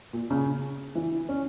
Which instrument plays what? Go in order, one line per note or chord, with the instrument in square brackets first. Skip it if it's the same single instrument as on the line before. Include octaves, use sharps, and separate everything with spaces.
[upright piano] A#2
C#3
E3
C#4